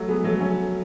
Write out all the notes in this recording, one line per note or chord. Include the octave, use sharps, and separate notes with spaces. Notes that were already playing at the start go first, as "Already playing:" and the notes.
Already playing: F#3 A3
G#3 B3
F#3 A3
A3 C#4